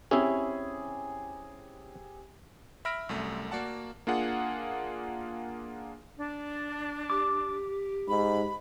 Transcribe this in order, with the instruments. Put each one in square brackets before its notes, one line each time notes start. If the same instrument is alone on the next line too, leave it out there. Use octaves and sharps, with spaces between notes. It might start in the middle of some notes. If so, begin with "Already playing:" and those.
[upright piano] C4 G4 G#4 [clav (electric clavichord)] C#4 E4 E5
[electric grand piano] E5 B5 E6 F6 A#6 D7
C2 F#2 A3
A#3 F#4 D5 F#5 A5
A#3 D4 F4 G#4 F#5
[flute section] D4
[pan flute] G4 [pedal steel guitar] D6
[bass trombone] G#2 [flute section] B5